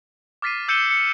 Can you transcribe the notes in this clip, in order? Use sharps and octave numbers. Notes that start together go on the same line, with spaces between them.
D6 F6 A6 B6 C7 D#7
E6 G6 C#7 D#7 E7 G7
C#7